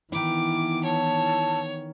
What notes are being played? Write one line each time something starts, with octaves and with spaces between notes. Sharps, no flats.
D#3 E3 B3 E4 D6
C#5 A5